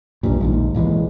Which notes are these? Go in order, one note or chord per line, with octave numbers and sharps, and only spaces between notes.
B1 G2 A#2
A#1 D#2 G#2
C#2 A#2 E3 G#3